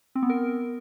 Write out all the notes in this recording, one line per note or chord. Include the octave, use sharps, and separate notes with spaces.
C4
B3
A#4